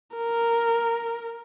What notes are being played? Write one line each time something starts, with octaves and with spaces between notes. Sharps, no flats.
A#4